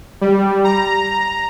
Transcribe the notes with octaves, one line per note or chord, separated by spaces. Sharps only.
G3
A#5